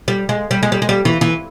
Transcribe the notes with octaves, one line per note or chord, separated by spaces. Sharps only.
G3
G#3
G3
G#3
G3
G#3
G3
E3
E3